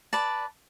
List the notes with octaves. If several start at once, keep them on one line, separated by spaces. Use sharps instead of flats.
B4 D5 A5